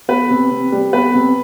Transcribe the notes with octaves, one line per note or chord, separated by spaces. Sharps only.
B3 B4
C3
C3
G3
B3 B4
C3